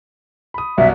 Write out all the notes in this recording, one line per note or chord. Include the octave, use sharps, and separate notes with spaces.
B5 D#6
C2 F#2 B2 E5